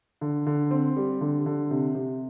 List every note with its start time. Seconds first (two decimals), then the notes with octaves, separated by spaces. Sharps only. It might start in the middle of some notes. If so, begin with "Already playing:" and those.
0.21 D3
0.47 D3
0.71 C4
0.96 G3
1.21 D3
1.46 D3
1.71 C3
1.95 C3